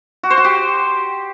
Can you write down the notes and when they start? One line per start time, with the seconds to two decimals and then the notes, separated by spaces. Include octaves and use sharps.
0.23 F#4
0.30 C5
0.37 F#4
0.44 G4